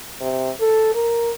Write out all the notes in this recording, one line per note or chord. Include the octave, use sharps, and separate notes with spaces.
C3
A4
A#4